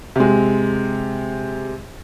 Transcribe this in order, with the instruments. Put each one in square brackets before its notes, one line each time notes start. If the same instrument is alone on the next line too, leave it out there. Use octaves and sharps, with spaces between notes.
[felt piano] C3 G#3